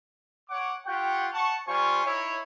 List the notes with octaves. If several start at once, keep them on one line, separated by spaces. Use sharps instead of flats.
C#5 F#5 D6
F4 G4 F#5 G5 C#6
F#5 A5 C#6
G3 F4 C5 G#5 C#6
D#4 E4 C#5